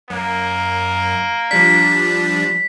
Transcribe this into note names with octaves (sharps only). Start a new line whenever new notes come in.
F#2 A#3
F3 G3 D4 B6